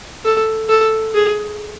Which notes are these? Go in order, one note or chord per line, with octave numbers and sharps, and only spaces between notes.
A4
A4
G#4